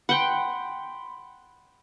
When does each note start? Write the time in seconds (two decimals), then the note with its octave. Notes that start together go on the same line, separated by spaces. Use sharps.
0.09 F#5 G5 B5 C6